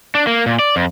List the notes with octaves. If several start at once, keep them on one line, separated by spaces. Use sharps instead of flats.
D4
A#3
A#2
D5
F2